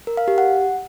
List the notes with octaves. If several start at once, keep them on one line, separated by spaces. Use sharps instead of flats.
A#4
F5
G4
F#5